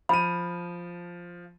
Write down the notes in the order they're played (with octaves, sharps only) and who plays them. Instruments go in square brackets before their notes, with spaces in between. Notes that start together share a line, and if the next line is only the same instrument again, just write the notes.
[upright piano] F3 D#7 [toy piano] B5